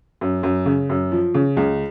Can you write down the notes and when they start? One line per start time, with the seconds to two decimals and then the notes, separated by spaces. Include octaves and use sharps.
0.21 F#2
0.43 F#2
0.66 C#3
0.90 F#2
1.12 F3
1.34 C#3
1.57 C#2